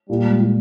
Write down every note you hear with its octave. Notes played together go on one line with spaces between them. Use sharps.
A#2 G3
G#3
A#2